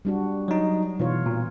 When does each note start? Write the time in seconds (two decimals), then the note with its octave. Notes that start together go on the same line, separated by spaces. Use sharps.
0.05 G3 D4 F#4
0.48 F#3 D#4
1.00 B2 E3 F4 C#5
1.26 A#2